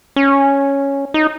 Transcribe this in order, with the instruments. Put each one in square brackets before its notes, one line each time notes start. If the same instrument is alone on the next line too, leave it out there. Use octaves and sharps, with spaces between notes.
[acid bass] C#4
D#4